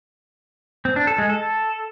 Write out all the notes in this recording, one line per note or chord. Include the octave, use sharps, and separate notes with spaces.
C4
D4
A4
G#3
A4